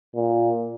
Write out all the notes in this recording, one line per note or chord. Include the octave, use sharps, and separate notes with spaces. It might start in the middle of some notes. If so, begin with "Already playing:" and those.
A#2